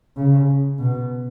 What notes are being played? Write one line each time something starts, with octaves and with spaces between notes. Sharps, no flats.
C#3
B2